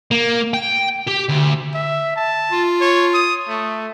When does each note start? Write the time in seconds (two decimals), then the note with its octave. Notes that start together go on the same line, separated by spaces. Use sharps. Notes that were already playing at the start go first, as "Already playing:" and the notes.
0.11 A#3
0.54 G5
1.08 G4
1.29 D2
1.74 E5
2.16 A5
2.51 F4
2.81 C#5
3.14 D#6
3.48 A3